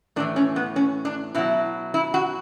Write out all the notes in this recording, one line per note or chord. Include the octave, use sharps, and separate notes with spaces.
A2 E3 D4
C#4
B3
C#4
D4
B2 F#3 E4
E4
F#4